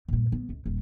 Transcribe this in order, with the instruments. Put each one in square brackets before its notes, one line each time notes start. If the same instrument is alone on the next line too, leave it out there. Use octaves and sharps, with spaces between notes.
[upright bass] G2 A#2
B3
C#2
D#1 G3